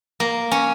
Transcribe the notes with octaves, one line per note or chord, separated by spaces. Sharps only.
A#3
C#4